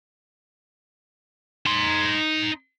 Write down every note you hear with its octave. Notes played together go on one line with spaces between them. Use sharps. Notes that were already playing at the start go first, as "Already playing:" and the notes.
D#4 C6